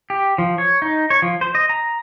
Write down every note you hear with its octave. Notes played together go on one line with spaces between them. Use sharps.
G4
F3
C#5
D#4
C#5
F3
C5
D#5
A#5